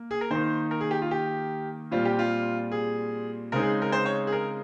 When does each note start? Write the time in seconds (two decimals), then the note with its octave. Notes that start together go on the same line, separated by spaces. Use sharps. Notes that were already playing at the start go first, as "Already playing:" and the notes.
Already playing: A#3
0.11 G#4
0.21 A#4
0.31 D#3 A#3 D#4 C5
0.71 A#4
0.81 G#4
0.91 G4
1.02 F4
1.11 G4
1.91 A#2 G3 C4 F4
2.05 G4
2.19 F4
2.72 G#4
3.52 C#3 G#3 C4 D#4 A#4
3.62 G#4
3.82 A#4
3.92 C5
4.05 C#5
4.27 G#4
4.32 A#4